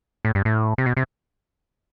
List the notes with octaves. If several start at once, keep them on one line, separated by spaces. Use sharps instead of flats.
A2
G2
A2
C3
B2
C3